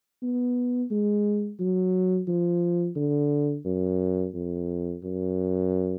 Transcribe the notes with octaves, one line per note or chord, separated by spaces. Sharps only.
B3
G#3
F#3
F3
D3
F#2
F2
F#2